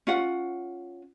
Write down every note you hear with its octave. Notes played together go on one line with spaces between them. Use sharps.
C#4 F4 F#5